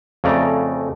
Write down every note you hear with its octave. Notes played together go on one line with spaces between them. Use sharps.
F2 C#3 A3 D5 A#5